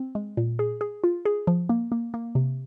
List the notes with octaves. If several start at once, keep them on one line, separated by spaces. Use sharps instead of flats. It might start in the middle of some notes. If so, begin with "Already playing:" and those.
Already playing: C4
G#3
A#2
G#4
G#4
F4
G#4
F3
A#3
A#3
A#3
C3